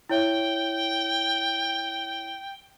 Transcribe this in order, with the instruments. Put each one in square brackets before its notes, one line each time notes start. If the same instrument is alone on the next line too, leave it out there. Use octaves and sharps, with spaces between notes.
[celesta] E4 C#5 E5 [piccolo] G5